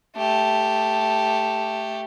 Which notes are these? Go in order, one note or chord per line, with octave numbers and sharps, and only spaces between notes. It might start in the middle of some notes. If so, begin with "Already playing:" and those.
A3 G4